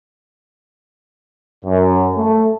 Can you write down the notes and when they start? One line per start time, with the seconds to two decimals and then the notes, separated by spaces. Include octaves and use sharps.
1.65 F#2
2.15 A3